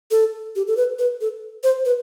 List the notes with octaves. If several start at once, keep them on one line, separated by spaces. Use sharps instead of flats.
A4
G4
A4
B4
B4
A4
C5
B4